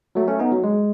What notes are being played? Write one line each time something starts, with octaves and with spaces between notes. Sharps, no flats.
F#3 A3
A3 C#4
B3 D#4
F#3
G#3